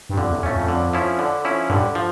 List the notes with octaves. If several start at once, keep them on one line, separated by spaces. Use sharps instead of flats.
G2
F2 D3
E2
F2 A3 C#4
F2
D3
F3 C#4 E4
D3
F3 C#4 E4
G2 D3
F3